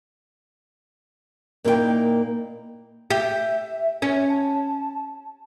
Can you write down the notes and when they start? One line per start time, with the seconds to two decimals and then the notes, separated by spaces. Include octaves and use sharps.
1.64 A#2 A#3 D#4 E4 A#4 G5
3.10 G4 E5
4.02 C#4
4.29 A5